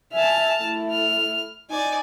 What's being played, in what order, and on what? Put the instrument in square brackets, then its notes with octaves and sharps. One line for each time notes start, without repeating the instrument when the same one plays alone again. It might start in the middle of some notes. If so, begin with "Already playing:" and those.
[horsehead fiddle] E5 G#5 [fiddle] A5 F6
[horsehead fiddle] A3 E4
[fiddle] F6
[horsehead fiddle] D#4 [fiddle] D5 G#5